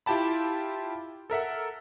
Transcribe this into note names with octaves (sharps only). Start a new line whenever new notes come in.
E4 F4 G4 G5 A5 B5
A4 A#4 E5 F#5